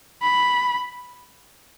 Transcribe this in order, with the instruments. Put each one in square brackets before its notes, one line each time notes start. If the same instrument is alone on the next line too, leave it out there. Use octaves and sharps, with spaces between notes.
[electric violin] B5